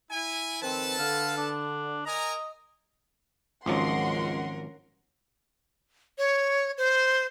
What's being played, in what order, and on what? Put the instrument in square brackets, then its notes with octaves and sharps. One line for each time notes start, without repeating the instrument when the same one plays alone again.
[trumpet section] E4 G#5
[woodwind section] D#3 F3 C4 [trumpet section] A4 B4 A5
[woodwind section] D3 [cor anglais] F5
[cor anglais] D4
[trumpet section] A#4 G#5 A#5 [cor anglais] D#5
[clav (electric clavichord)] G#1 F3 F#3 [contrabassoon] C#2 [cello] C#4 A#4 [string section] F#5 C6
[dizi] C#5
C5